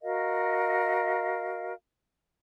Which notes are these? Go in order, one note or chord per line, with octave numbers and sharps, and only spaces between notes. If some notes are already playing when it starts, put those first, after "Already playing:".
F#4 A#4 D#5 F5